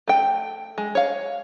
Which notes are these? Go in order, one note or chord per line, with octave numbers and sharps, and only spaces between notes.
A3 G5
G#3
C#5 F5